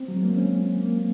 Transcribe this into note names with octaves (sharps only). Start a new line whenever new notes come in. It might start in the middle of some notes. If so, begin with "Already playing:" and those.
Already playing: C4
F#3
G#3
A#3
C4
C#4
A#3